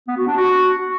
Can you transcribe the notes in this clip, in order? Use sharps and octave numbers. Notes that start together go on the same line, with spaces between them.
B3
F#4
D4
F#4